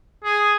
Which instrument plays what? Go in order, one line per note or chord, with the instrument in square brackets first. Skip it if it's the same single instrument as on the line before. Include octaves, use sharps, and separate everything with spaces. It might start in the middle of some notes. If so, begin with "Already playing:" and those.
[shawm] G#4